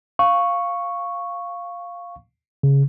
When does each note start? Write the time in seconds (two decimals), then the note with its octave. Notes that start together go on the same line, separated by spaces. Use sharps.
0.19 F5 C#6
2.63 C#3